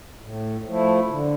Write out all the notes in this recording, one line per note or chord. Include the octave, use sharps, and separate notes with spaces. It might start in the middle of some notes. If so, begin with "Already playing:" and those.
A2
F3 A3 E4
D3